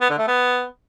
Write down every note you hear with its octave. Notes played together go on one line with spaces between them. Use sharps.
B3
D3
A3
B3